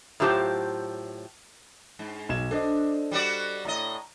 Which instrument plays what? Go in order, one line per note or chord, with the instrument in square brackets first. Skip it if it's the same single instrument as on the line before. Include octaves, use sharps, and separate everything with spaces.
[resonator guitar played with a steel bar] A2 F#3 F4 G4 C5 A5
[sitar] G#2
[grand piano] B1 G#6 E7
[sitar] D4 [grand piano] A4 C5 D#5
[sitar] G3 F#4 D5
[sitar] A2 D#5 [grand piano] A#5